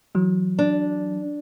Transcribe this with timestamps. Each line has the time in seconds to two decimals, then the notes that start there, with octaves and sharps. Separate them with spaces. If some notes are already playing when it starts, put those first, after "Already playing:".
0.15 E3 F#3
0.59 D4